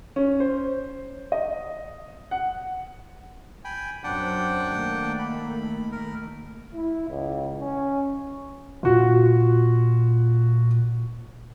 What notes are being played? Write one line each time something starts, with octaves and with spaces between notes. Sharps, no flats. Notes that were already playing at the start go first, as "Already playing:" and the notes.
C#4
C5
D#5
F#5
G5 G#5 B5
F#2 F#3 C4 D4 F#5 G5
D#3 A3 A#3
B5
D#3 A3 A#4
E4
C#2
C#4
A#2 F4 F#4